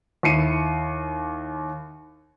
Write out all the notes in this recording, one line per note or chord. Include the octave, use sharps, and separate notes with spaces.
D#2 E4 C7 C#7 D#7